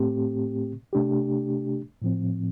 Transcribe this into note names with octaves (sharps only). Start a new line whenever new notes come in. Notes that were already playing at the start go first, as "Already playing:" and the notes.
Already playing: A2 A3 C4 G4
C3 A3 D4 G4
A2 F3 C4